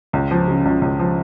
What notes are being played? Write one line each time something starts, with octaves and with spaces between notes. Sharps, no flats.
C#2
F3
C#3
C#2
C#2
F3